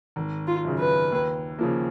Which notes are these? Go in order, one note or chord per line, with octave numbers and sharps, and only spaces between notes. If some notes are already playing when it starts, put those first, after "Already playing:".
G#1
F4
F#2 C#3
B4
D#2
C#3 F3 A#3